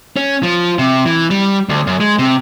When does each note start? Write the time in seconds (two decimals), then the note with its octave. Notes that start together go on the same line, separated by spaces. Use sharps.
0.16 C#4
0.43 F3
0.79 C3
1.06 E3
1.30 G3
1.69 D2
1.87 F#2
2.00 G#3
2.19 C3